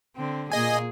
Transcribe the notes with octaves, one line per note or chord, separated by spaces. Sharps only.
D3 C4
A#2 A#3 G#4 D#5 G#5